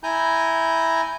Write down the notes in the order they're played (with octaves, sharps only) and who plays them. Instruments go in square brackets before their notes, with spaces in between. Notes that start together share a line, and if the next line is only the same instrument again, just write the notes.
[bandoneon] E4 G#5 A#5 G6